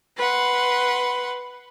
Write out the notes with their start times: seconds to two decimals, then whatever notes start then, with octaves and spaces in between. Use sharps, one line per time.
0.18 B4 F#5 C6